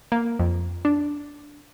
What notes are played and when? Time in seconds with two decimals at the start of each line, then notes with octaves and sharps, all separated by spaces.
0.12 A#3
0.39 F2
0.85 D4